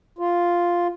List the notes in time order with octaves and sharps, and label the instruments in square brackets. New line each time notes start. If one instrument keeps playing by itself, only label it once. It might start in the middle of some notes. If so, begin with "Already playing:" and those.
[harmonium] F4